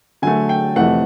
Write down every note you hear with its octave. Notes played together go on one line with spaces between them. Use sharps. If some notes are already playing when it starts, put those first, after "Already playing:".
D3 F#3 A3 G#5
G5
F2 C3 E3 A3 F#5